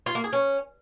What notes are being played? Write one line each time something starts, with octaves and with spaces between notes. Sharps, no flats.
F4
A#3
G#4
C#4